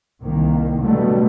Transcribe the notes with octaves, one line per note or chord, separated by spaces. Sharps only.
C2 D#3 A#3
B2 D3 F#3 G3 A3